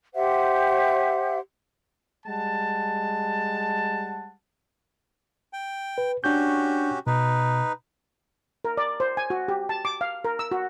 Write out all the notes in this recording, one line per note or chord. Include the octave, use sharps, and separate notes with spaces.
G4 C5 E5 F#5
G3 G#3 F#5 A5
G5
B4
C#4 D4 F#4 G4 G6
B2 D#4 B4
A#4
D5
C5
G#5
F#4
G4
A5
D6
F5
A#4
E6
F#4